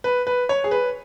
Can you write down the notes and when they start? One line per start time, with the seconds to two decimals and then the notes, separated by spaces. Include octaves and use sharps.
0.04 B4
0.27 B4
0.49 C#5
0.64 G#4
0.71 B4